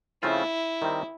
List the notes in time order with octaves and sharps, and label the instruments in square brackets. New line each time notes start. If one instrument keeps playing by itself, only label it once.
[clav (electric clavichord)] C#3 F3 A3 C4 F4 [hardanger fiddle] E4
[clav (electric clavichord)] D#3 G3 C4 D#4